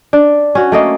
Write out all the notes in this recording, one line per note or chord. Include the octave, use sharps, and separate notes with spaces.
D4
C#4 F#4
A3 A#3 D#5